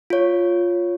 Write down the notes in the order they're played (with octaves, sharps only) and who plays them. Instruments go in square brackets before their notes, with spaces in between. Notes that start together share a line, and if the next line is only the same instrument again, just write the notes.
[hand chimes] F4 C#5